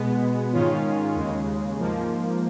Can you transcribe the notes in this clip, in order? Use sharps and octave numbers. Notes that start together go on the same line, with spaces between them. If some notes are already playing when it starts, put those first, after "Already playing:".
Already playing: B2 G#3 B3
G#2 D#3 G#3 C#4 F4
D#2 C#3 G#3
G#2 F3 A#3